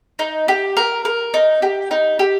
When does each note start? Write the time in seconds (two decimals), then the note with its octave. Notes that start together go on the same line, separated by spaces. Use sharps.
0.19 D#4
0.48 G4
0.77 A#4
1.05 A#4
1.34 D#4
1.62 G4
1.91 D#4
2.19 G4